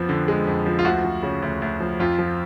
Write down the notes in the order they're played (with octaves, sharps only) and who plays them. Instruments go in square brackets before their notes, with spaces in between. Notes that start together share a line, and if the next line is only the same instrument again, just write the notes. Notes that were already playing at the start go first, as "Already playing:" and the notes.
Already playing: [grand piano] F2 F3 B3
D3
G#3
F2
F3
F4
D2 F#4
F3
C#3
D2
D2
F3
F2 F4
F3